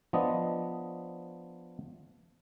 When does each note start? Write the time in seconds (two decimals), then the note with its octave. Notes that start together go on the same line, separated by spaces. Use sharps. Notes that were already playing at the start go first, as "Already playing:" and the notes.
0.13 F3 B3 D4 D#5